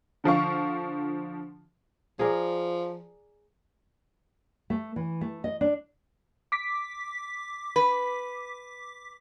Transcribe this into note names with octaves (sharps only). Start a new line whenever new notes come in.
D3 F3 F5 C#6
F3 G#4 A#4 D5
A3
E3
A3
D#5
D4
D6 B6
B4